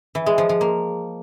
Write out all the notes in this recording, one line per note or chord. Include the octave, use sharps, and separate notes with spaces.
E3
G#3
F3
F3
A#3